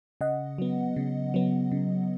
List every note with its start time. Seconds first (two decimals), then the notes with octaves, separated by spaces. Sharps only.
0.21 C#3 D#5 F#5
0.58 F#3 B3
0.96 C#3
1.34 F#3 B3
1.72 C#3